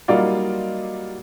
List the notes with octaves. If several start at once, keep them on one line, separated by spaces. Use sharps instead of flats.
F#3 G3 A#3 D#4 F4 D5